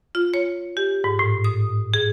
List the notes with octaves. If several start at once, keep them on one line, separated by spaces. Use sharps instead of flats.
F4
C#5
G4
G#2
A2
D#6
G#4